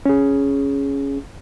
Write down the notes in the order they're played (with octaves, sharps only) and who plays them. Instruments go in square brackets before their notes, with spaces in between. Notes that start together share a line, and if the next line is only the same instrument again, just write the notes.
[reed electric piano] C#4 G#4